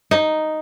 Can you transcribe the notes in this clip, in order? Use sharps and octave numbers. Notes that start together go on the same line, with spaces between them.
D#4